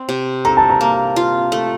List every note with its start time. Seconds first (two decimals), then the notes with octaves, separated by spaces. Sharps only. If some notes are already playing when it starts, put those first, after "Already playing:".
Already playing: C4
0.09 C3
0.45 A4 A#5
0.57 A5
0.70 A#5
0.81 A#3
1.16 F4
1.52 A3